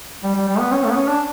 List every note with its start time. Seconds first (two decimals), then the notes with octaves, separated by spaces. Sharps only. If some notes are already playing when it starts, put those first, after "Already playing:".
0.23 G3
0.35 G3
0.48 G3
0.59 B3
0.72 C#4
0.84 A3
0.90 B3
0.96 C#4
1.08 D4